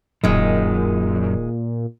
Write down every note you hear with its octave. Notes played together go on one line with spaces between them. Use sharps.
D1 F#2 A#2 D#3 G#3